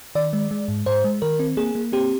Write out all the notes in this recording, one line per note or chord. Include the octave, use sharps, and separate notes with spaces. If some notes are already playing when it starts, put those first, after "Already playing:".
D#3 D5
G#3
G#3
G#2
G#2 C5
G#3
D#3 A#4
C4
A#3 G#4
A#3
C4 G4